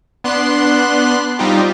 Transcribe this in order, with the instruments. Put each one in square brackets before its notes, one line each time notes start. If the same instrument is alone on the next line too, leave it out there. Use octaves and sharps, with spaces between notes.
[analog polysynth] B3 D4 C6 F#6
G3 C4 D#4 F4 G4